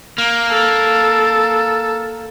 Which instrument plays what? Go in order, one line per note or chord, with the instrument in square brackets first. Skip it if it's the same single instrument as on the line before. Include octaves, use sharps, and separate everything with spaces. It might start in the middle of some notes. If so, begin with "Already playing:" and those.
[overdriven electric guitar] A#3
[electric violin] A4